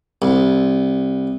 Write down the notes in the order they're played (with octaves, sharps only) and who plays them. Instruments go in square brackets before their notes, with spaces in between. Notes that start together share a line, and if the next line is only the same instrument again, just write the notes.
[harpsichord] C2